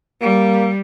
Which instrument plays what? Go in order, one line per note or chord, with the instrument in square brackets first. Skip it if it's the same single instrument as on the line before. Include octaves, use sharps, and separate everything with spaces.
[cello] G3 [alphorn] A#3